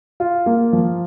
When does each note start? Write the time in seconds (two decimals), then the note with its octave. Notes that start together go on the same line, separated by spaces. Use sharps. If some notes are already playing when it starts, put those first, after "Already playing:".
0.20 F4
0.46 A#3
0.73 F3